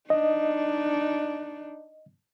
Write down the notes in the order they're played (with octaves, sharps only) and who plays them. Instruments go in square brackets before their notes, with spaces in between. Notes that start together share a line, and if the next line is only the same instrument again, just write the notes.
[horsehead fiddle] D4 D#4 [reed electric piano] D#5